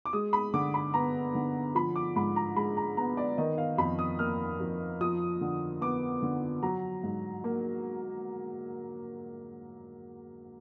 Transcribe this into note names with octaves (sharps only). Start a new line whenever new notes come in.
D6
G#3 D#6
B5
D3 D6
B5
B3 A#5
D3
F3 B5
D6
G#2 B5
A#5
G#3 B5
A#5
B3 A#5
D5
D#3 D#5
F5
F2 B5
D#6
A#3 F6
F2
F3 D#6
D3
B3 D6
D3
F#3 A#5
G#2
A#3